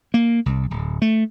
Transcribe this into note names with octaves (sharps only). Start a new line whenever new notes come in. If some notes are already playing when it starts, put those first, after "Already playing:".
A#3
C2
D1
A3